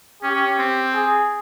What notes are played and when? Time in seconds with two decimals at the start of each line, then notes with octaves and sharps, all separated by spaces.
0.22 C#4 G4
0.34 C#4
0.47 C#4
0.58 C4
0.94 G#4